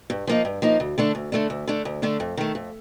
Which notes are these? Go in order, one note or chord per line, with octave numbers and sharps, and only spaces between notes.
G2
F3 A#3 D#4
G2
F3 A#3 D#4
D2
D3 A3 D4
D2
D3 A3 D4
D2
D3 A3 D4
D2
D3 A3 D4
F2
D#3 A3
F2